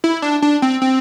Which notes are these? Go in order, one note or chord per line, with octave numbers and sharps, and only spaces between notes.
E4
D4
D4
C4
C4